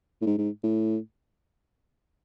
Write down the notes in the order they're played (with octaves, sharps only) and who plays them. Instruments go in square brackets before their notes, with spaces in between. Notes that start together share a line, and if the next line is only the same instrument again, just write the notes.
[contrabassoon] A2
G#2
G#2
A2